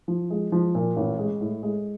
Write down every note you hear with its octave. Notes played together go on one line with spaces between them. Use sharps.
F3
G#3
F3
A#2
A1
G#3
A2
G#3